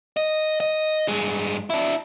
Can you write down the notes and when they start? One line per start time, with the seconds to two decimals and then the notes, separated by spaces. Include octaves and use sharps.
0.17 D#5
0.60 D#5
1.08 G2 G#3
1.70 D4 E4